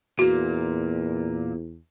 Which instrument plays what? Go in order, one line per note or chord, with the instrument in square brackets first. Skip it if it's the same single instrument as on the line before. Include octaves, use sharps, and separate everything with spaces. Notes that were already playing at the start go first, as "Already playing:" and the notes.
[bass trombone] E2 [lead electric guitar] A#2 A#3 [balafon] F#4